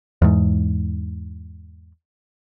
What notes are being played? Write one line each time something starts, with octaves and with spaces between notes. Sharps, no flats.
E2 G#2